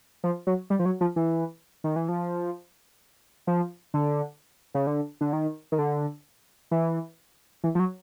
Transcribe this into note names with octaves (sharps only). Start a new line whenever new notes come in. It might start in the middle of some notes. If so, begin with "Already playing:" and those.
F3
F#3
G3
F3
F#3
F3
E3
D#3
E3
F3
F3
D3
C#3
D3
D3
D#3
D#3
D3
E3
E3
F3
F#3